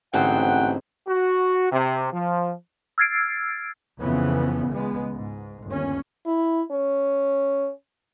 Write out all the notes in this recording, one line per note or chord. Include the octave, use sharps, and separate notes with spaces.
A1 G#2 D3 C4 F#5 G5
F#4
C3
F3
E6 F6 G#6 A6 C7 D7
F2 C#3 E3 B3
C#2 G#3 B3
G#2
G1 D#2 C#4
E4
C#4